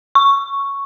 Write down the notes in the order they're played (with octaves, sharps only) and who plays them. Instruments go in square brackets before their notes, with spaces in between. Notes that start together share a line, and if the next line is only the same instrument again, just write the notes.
[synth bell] C#6